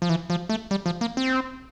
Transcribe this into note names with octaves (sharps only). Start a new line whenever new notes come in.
F3
E3
F3
A3
G3
F3
A#3
C4